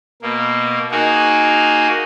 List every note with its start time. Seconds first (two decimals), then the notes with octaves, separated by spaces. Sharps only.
0.22 B2 A#3
0.91 A#3 D#4 F#4 G#4 A#4